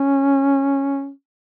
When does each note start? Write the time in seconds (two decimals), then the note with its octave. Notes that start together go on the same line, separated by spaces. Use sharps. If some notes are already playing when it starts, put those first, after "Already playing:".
Already playing: C#4